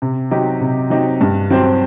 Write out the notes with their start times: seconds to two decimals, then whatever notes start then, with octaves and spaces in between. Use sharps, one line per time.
0.02 C3
0.31 F#3 C4 D#4 G4
0.61 C3
0.90 F#3 C4 D#4 G4
1.21 G2
1.51 F#3 C4 G4 C5